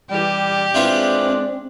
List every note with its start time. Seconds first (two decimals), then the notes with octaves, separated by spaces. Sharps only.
0.11 E3 G3 G4
0.74 G#3 C4 D4 E4 F4 B4